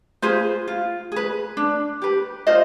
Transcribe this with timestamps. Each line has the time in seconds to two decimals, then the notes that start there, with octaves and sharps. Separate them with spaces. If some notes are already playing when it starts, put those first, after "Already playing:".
0.22 F4 G#4 B4 C5
0.68 F4
1.12 G#4 B4
1.57 D4
2.02 G4 B4
2.47 F4 C5 D#5